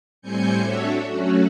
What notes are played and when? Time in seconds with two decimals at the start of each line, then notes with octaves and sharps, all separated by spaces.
0.22 A2 G3 C4 G#5 G6 C#7
0.63 D4 F#4 A4 C#5 E5
1.05 F#3 A3 C#4 F#4